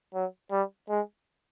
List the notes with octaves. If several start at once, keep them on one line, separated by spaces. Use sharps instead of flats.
F#3
G3
G#3